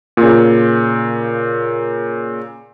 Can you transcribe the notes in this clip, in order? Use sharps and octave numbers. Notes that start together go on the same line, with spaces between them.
A#2 C#3